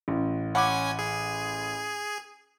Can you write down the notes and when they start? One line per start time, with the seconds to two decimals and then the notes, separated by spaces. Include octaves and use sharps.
0.08 A1
0.55 C#4 F#5 G#5 B5 D6
0.99 G#4